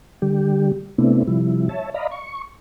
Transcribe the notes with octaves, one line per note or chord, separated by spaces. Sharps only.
D3 G3 G4
C3 A3 B3 C4 D4 E4
C3 F3 G3 E4
C#5 E5 A5
D5 D#5 F5 A#5 B5
C#6